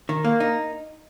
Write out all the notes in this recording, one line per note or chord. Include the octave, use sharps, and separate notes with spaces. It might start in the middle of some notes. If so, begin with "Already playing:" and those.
D#3
A#3
D#4